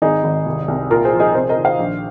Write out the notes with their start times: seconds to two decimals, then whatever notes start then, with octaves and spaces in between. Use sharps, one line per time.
0.02 G#1 D#4 G#4
0.24 G#1
0.46 C2
0.68 C2
0.90 A#2 F4 A#4
1.05 G#4 C5
1.13 F3
1.20 D#4 G#4
1.35 C3 G#4 C5
1.49 A#4 D#5
1.57 D#3
1.65 C5 F5
1.79 A#1